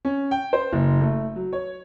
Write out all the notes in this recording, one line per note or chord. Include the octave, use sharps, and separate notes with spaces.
C#4
G5
C5
F#1
A3
F#3
C#5